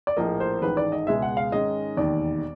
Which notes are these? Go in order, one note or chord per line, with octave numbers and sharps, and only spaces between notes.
D5
A#1 A2 F3 A#3 D#5
C5
A1 G#2 D#3 B4
D5
D#5
C#2 B2 G#3 E5
F#5
F5
G#2 D#3 G#3 C#4 D#5
E1 D#2 D#3 D5